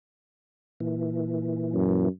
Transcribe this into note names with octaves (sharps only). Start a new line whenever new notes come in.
A#2 E3
F#2